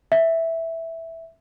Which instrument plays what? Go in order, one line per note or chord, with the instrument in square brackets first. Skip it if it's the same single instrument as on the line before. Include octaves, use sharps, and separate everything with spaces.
[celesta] E5